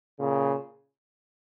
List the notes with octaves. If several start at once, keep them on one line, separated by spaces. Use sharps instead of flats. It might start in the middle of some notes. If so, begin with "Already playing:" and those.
A#2 C#3